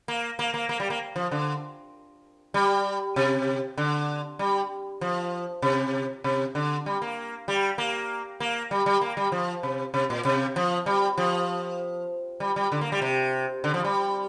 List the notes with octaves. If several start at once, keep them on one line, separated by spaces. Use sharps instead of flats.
A#3
A#3
A#3
A#3
G3
A#3
F3
D3
G3
C3
D3
G3
F3
C3
C3
D3
G3
A#3
G3
A#3
A#3
G3
G3
A#3
G3
F3
C3
C3
A#2
C3
F3
G3
F3
G3
G3
D3
A#3
G3
C3
D3
F3
G3